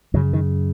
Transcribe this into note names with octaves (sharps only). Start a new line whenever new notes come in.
F#2 C#3 F#3
D#3